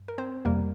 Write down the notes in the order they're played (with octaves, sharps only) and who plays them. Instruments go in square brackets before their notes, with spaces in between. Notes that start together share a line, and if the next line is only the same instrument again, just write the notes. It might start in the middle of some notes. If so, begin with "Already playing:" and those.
Already playing: [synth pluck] G2
A#4
C4 C5
F2 C3 G3 A#3 A#4